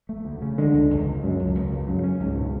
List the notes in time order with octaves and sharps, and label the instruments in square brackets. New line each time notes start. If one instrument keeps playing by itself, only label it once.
[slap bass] A3
D2
C#3
[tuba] D3 [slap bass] G#3
[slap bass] C#2
C#2
C#3
[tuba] F#2 [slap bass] G#3
[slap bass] C#2
C#2
C#3
[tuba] F#2 [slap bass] F#3
[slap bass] C#4
[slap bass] C#2 [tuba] G#2
[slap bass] B2